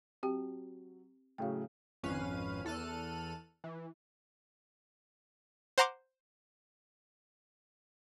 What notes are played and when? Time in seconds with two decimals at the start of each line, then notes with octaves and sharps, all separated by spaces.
0.23 F#3 C4 G4 G5
1.38 A2 C#3 F#3 F5 G5
2.03 G#1 F2 C#4 B4 F5 D#7
2.65 E2 A4 F6 F#6 D#7
3.64 E3
5.78 C5 F#5 A#5 C6 D6